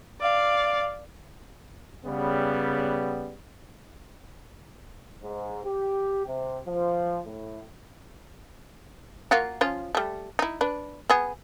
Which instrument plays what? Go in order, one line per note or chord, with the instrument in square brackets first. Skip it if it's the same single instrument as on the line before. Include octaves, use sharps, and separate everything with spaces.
[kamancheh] D5 F5
[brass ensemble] C#3 G3 B3
[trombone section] G#2
G4
C3
F3
A2
[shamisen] A#3 F4 F#4
F3 C#4 F4
G3 A3
D#4 E4
D4 B4
B3 G#4